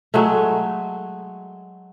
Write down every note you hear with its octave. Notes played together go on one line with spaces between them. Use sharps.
F#3 G#3 A3